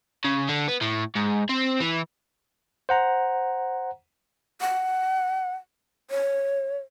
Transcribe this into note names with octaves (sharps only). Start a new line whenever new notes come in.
C#3
D3
B3
A2
G#2
C4
E3
C5 F#5 A#5
F#5
C#5